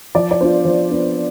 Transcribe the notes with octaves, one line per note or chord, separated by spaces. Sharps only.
F3 D5
D5
B3 D4 F4 C5
F3
B3 D4 F4